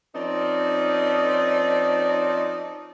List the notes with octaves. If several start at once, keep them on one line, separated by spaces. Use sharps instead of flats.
F3 C4 C#4 D#4 A#4 D5